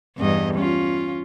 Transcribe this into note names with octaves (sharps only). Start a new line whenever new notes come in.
E2 G2 D#5
C#4 F4